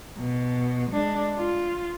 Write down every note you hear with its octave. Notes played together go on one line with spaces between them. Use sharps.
B2
G#3 D4
F4